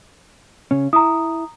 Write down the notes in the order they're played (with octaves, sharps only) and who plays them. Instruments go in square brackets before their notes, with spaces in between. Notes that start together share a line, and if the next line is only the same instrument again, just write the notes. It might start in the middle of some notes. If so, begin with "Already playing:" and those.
[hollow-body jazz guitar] C#3 C#4
[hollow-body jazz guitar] E4 [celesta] A#5 D#6